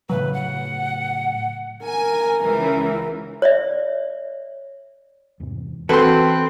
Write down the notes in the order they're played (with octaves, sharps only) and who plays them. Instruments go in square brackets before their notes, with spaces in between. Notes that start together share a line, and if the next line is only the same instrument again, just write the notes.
[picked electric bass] A2 C#3 F#3 [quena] B4
[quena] F#5
[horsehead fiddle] A#4 [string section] G#5
[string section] C#2 E3
[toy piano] C#5 D5 E5
[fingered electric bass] E2 G#2 C3
[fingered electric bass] E3 D4 [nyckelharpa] C4 [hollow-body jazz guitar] F#4 A4 [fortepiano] B4 C6